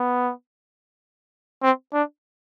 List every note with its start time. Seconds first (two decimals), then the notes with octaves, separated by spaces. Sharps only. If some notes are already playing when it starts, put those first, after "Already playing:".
Already playing: B3
1.62 C4
1.93 D4